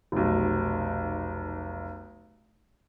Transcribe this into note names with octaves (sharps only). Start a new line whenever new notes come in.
F1 B1